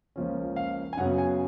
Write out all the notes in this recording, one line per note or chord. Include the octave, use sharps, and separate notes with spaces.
C#2 C#3 F3 A#3 C#4
F5
G#5
F#2 C#3 F#3 B3 F#5
G#5